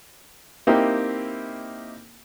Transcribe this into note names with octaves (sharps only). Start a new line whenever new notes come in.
A#3 C4 D#4 E4 G4 A#4